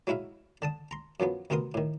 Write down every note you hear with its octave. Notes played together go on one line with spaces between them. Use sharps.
F#3 G#3 E4 E5 F5
D3 A5 D#6
A#5 C6
F#2 F3 F#3 B3
D2 C3 B3 A#4 C6 D#6
A2 D#3